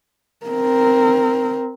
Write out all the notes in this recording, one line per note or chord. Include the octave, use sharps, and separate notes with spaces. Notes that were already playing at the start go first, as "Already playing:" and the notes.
C4 A#4